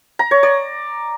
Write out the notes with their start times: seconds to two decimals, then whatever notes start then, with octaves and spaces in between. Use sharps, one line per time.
0.19 A#5
0.31 C#5
0.43 D5